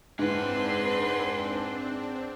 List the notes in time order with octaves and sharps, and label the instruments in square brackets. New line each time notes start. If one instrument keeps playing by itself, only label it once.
[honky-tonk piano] G#2 E4 [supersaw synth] C4 D4 [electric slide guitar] G#4 F#5 [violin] B4 C6